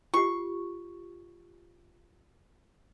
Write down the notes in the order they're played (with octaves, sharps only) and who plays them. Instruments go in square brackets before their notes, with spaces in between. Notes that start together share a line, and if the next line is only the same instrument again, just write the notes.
[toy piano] F4 G4 [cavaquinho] C#6